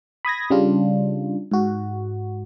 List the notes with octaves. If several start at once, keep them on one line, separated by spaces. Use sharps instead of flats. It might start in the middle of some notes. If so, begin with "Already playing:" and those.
B5 D#6 G#6 A#6
C#3 G3 D4 F4
G#2 F#4